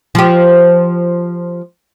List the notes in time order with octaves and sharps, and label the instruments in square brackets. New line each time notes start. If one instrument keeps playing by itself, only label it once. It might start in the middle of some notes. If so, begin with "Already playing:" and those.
[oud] F3 G4